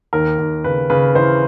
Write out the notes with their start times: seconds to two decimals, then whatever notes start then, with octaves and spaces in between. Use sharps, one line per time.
0.13 D#2 A#4
0.38 D#2
0.64 C#3 B4
0.90 C#3 B4
1.15 E3 C5